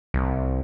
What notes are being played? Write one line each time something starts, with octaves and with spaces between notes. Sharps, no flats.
C2